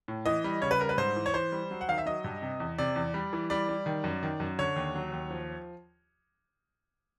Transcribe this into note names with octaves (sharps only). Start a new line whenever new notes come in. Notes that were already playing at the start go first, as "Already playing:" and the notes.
A2
E3 D#5
G3
C#3 C#5
B4
G3 A#4
B4
G#2 C5
E3
C#5
E3 C5
G3
F#3
F#5
D#3 F5
E5
F#3 D#5
G2
C3
E2
C3 D5
E2
G3
E3
G3 D5
G3
D#3
F#2
D#3
F#2
D3 C#5
D#2
F#3
D#2
F3